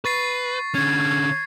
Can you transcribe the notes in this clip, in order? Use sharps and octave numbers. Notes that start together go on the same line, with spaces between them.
B4 C#6 A6 C7
D3 C#4 G#6